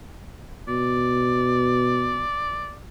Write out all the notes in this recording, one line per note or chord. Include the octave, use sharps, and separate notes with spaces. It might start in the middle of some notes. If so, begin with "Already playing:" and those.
B2 D5